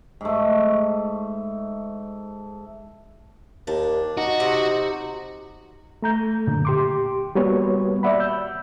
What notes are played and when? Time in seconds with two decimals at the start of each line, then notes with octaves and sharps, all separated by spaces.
0.21 G#2 A3
3.67 D#2 D4
4.17 D#4 F#4
4.40 C3
6.02 A3 A#5 G6
6.47 F#2 A#2 D3
6.65 G4 C6 D6
7.35 G3 A#3 B3 F#4 B4 C#5
8.03 D5 E5 F#5 B5
8.20 E6 G6